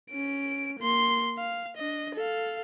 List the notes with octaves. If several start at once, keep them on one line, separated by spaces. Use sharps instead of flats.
C#4 D7
A#3 C6
F5
D4 D#5
A4 F5